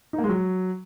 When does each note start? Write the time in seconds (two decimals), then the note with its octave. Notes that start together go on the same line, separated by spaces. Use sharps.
0.13 D#4
0.18 A#3
0.24 G#3
0.29 F#3